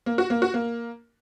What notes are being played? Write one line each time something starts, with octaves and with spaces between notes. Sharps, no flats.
A#3
F#4
A#3
F#4
A#3